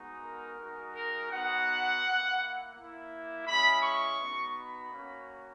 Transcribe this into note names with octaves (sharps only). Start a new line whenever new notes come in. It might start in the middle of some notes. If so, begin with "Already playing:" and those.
Already playing: G#3 B3 D#4 F#4
A#4
G#3 D#4 F#4
A#4
B3 D#4 F#4 F#5
A#3 E4
A#3 E4
G#3 C#4 E4 B5
C#6
B3 D#4 F#4
B5
A#3 C#4 F#4